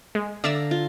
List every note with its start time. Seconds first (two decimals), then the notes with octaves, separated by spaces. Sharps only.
0.15 G#3
0.44 D3 D5 E5 F5 A#5 E6
0.71 F4